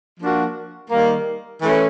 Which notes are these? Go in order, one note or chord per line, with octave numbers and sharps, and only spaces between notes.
F3 A#3 D4 F#4
D#3 G3 A#3
E3 A3 C#4